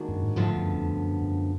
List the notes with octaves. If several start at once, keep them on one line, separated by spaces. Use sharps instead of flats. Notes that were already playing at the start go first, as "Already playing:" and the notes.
Already playing: D#2 D#3 G#3 D4 F#4
F#2
G#2
D2 G#2 D3 F3 B3
F#2
F2
F#2
F#2